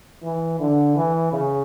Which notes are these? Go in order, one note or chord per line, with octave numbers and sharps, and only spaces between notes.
E3
D3
E3
C#3